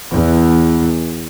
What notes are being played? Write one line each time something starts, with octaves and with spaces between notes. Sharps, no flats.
E2